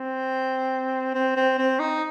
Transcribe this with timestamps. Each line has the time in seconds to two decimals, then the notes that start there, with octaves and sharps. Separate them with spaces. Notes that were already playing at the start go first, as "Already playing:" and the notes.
Already playing: C4
1.14 C4
1.36 C4
1.58 C4
1.80 D#4